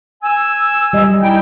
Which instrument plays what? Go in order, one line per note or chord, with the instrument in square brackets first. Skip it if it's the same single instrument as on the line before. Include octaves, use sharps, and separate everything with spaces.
[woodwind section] G#5 E6
[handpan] G3 D#5
[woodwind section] D#4 E4 G5